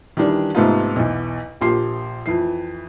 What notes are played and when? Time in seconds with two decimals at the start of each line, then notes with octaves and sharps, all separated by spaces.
0.17 D#3 E3 G3 D4
0.55 G#2 C3 A3 B3 D#4 F4
0.96 B1 E2
1.61 A#1 F3 A#3 G4 C6 C7
2.26 F2 E3 C7